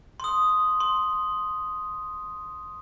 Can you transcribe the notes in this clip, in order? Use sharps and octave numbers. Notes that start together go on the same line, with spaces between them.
C6 D#6
C6